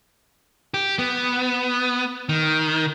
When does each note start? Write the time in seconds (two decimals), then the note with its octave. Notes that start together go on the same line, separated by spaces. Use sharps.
0.74 G4
0.99 B3
2.29 D#3